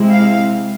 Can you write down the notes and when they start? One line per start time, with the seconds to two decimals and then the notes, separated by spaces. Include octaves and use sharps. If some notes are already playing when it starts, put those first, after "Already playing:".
Already playing: C3 G#3 C4 E4
0.11 F5